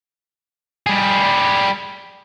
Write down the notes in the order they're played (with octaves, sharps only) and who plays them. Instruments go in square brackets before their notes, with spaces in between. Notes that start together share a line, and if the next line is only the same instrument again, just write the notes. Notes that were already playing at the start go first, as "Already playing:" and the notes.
[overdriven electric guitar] G3 G#4